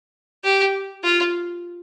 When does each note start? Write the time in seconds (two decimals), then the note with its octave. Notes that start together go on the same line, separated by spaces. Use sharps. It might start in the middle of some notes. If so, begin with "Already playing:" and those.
0.44 G4
1.04 F4